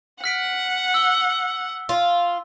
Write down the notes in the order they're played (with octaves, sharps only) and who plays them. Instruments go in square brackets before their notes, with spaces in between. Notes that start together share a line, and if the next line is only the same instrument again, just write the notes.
[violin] F#5 [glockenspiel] F6 B6 D7
[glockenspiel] E6 G7
[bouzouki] F4